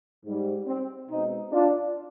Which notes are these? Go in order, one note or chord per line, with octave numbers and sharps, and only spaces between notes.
G#2 G3
C4
B2 G#3 C4 D#4
D4 F4